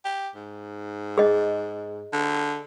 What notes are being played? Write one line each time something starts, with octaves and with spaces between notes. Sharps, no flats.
G4
G#2
G#4 D#5
D3